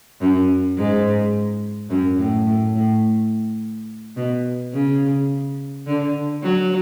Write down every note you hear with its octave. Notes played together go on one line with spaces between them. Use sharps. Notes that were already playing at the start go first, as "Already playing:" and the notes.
F#2
G#2
F#2
A2
A2
A2
B2
C#3
D3
F#3